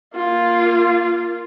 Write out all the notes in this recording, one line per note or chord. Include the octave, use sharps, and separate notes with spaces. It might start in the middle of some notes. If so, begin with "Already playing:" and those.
A#3 F4